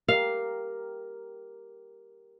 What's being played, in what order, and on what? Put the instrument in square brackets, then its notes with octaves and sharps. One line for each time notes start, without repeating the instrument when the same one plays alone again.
[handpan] G4 A#4 [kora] F5